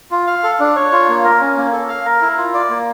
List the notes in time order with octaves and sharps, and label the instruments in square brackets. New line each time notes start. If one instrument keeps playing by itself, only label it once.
[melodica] F4
F5
A4
D4
C#5
F4
A#3
A#4
C#4
A#3
A4
F5
A#4
E4
F4
D5
A#3